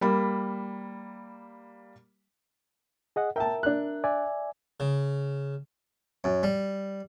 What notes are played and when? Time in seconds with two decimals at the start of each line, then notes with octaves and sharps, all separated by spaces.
0.01 G3 A#3 B5
3.16 G#4 D#5 F#5
3.36 A#4 E5 G5 A5
3.63 D4 F#6
4.04 D5 E5 G#5
4.80 C#3
6.24 F#2
6.43 G3